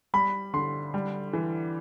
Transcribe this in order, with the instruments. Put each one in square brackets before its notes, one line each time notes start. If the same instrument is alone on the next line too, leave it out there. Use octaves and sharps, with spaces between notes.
[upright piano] G3 [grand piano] B5
[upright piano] D3 [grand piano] C6
[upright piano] G3
E3